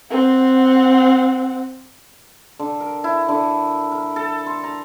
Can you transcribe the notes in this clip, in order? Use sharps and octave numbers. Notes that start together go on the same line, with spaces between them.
C4 F#5
D3
A#4
E4
D3
A#4
A4
C6
A#5